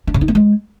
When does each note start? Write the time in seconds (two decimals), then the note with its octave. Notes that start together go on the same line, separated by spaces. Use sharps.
0.07 D4
0.14 C#3
0.21 D#4
0.28 A#3
0.35 G#3